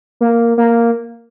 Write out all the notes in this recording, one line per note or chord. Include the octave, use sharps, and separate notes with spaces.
A#3
A#3